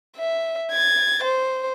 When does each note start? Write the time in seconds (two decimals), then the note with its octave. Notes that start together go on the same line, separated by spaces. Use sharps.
0.17 E5
0.71 G#6 A6
1.23 C5